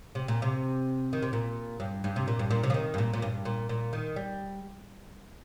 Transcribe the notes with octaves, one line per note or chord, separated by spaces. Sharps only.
C3
A#2
C3
D#3
C3
A#2
G2
G2
C3
A#2
G2
A#2
C3
F3
D#3
G2
A#2
A#2
G2
A#2
A#2
D#3
G3